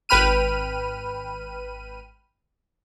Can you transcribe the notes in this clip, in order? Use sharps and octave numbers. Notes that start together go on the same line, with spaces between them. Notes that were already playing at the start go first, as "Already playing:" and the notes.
G#1 B4 G5 B5 F6 D#7